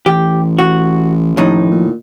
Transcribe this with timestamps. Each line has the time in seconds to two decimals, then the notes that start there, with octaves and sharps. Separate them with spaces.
0.06 A1 E3 G4
0.59 F#4
1.37 D#2 A2 F3 D#4
1.71 A#2